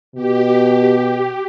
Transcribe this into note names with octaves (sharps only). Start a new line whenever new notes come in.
B2 G4